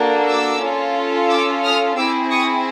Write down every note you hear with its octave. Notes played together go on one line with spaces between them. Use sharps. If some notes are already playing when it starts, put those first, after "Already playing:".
Already playing: A#3 D4 F#4 A4
D6 E6
C#4 F4 A4
D6 E6
D#6 F6
C4 E4 G#4 D6 E6
C#6 D#6